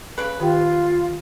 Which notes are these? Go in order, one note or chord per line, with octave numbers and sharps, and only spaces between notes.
C#3 B4
D#3 F4 G4 G5